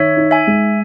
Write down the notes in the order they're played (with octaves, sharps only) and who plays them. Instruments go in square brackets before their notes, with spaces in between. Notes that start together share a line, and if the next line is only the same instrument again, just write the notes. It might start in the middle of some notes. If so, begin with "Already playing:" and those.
Already playing: [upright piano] D#3 [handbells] C#5 E5
[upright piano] D#4
[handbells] E5 G#5
[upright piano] G#3